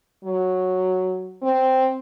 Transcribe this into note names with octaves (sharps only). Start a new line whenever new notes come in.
F#3
C4